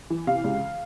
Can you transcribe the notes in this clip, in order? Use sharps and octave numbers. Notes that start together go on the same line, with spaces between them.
E3
C3 F5
C#2